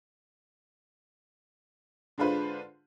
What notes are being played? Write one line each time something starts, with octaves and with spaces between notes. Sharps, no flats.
D3 G#3 D4 F4 B4 C5